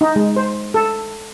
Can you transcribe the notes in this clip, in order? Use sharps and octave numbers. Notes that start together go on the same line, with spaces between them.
D#4
G#3
C5
A4